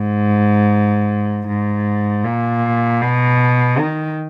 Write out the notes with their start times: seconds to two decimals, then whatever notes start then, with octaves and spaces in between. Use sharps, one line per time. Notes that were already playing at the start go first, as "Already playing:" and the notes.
Already playing: G#2
1.48 G#2
2.24 A#2
3.01 B2
3.78 D#3